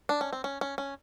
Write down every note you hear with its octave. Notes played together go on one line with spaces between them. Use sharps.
D4
C#4
C4
C#4
C#4
C#4